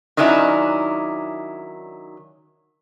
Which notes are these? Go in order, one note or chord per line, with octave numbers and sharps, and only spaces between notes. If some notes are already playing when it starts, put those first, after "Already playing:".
D#3 F#3 C#4 D4 E4